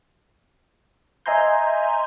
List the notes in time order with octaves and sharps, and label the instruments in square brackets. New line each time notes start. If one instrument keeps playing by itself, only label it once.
[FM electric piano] D#5 E5 G#5 A#5 C6 G6